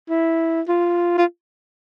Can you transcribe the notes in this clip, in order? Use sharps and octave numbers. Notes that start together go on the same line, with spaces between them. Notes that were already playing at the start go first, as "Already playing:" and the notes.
E4
F4
F4